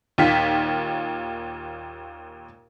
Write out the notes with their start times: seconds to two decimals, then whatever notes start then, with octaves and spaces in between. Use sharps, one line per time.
0.18 D#2 A#2 F4 B6